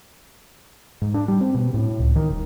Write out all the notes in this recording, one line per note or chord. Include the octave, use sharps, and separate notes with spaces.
G#2
D4
G3
C4
B2
A2
C#2
D#3
D#1